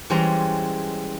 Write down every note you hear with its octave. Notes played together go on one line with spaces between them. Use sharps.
E3 G3 G#3 C#4 C5 A#5